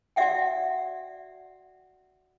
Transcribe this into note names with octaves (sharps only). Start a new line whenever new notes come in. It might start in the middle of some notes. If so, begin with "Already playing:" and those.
F#4 D5 E5 F#5 G5